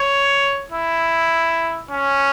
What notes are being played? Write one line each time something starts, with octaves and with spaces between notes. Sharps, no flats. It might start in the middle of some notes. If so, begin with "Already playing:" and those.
Already playing: C#5
E4
C#4